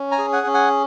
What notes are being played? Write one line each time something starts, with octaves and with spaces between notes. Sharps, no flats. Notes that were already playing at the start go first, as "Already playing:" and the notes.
Already playing: C#4
G#5 A#5
G#4
F#5 G#5
C#4
F#5 G#5